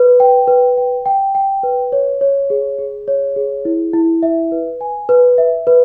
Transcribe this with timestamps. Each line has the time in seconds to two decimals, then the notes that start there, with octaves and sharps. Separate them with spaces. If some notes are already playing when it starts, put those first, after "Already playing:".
Already playing: B4
0.20 G5
0.48 B4
0.77 G5
1.06 G5
1.35 G5
1.63 B4
1.92 C#5
2.21 C#5
2.50 G#4
2.79 G#4
3.08 C#5
3.36 G#4
3.65 E4
3.93 E4
4.23 E5
4.52 B4
4.81 G#5
5.09 B4
5.38 E5
5.67 B4